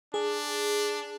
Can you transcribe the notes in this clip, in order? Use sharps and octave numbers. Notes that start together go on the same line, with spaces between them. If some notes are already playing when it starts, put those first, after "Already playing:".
D4 G#4